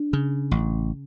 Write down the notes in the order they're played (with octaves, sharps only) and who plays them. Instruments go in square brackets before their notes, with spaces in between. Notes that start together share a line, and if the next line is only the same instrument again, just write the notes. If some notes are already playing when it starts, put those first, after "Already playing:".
Already playing: [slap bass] D4
C#3
A1